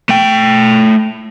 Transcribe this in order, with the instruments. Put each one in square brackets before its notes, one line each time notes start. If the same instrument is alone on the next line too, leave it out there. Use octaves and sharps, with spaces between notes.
[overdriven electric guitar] A3 G5